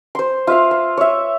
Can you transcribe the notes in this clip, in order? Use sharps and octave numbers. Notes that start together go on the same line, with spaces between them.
C5 C6
F4 E5 F5
C6
C#5 E5